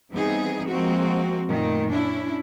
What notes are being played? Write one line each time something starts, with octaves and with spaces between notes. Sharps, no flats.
E3 G3 B3 C4 D#4 G#4
F3 G#3 A#3 C4 F#4
F#2 A#2 D#3 A3
C#4 D4 E4